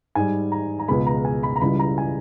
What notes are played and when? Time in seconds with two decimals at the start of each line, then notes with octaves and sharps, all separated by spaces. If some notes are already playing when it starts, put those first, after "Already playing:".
0.15 G#2 G3 G#5
0.52 A#5
0.79 A#5
0.88 C#2 B2 G#3 B5
1.06 A#5
1.25 G#5
1.43 B5
1.56 A#5
1.61 C#2 C#3 E3 G3 B5
1.79 A#5
1.98 G#5